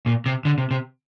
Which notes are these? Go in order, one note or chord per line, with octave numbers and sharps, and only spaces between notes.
A#2
C3
D3
C3
C3